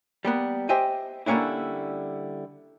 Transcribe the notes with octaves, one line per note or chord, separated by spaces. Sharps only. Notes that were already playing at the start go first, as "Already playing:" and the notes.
G3 A#3 B3
G4 C5 D#5 E5 G5 G#5
D3 G3 A#3 C#4 D4 E4